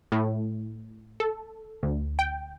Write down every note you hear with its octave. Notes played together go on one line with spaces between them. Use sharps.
A2
A4
D2
G5